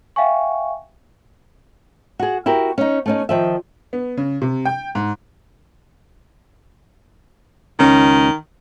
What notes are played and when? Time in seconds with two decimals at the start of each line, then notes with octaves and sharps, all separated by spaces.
0.16 E5 F5 G5 G#5 C#6
2.19 F#4 G#4
2.46 E4 F#4 G4 A#4
2.78 C#4 D#4
3.06 A3 C#4 D#4
3.29 D#3 F3 E5
3.93 B3
4.17 C#3
4.42 C3
4.65 G5
4.95 G#2
7.79 C#2 D#3 C#4